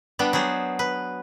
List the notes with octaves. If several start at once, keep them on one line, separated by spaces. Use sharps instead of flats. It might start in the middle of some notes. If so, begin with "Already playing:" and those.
G3 B3 D4
F#3 B3 G#4 C5
B4